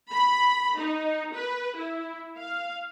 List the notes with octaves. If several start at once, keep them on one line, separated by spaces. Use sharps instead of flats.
B5
D#4
B4
E4
F5